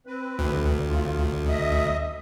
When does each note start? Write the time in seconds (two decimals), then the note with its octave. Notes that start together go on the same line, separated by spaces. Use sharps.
0.06 C4 B4
0.39 D2
0.87 F4
1.49 D#5 E5 D#6